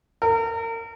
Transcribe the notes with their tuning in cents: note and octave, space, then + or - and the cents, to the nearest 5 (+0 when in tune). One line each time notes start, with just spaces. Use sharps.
A#4 -35